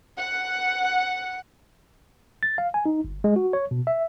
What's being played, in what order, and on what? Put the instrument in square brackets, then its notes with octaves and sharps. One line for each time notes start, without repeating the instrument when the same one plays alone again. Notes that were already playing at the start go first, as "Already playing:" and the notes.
[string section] F#5
[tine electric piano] A6
F5
G#5
D#4
G1
G#3
F#4
C#5
B2
E5